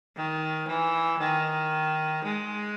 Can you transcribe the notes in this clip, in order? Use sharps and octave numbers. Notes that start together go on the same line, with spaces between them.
D#3
E3
D#3
G#3